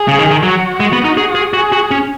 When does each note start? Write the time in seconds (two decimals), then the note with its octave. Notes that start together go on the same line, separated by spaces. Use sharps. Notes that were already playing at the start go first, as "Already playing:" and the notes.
Already playing: G#4
0.08 C#3
0.19 D#3
0.31 D#3
0.43 F#3 F#4
0.80 G#3
0.93 B3
1.05 D#4
1.17 G#4
1.35 G#4
1.54 F#4 G#4
1.72 F#4
1.91 C#4